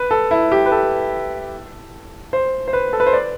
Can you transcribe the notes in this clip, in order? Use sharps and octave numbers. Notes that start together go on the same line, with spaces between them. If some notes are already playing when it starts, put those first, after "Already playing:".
Already playing: B4
A4
E4
G4
B4
A4
C5
C5
B4
A4
B4
C5
D5